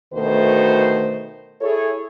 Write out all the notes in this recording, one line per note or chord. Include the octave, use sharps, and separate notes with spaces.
D2 B2 D#3 A3 B4 C5
E4 G#4 A4 C#5